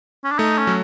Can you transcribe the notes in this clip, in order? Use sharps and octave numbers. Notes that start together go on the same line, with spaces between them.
C#4
D4
A3 D#4
C#4
F#3